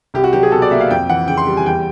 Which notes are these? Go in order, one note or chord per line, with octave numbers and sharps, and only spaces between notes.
C2 G4
F#4
F#3 G4
G#4
B2 A4
D5
A#3 E5
F5
F2 G5
E3 F#5
C#3 G5
C6
G3
G#5
E2 G5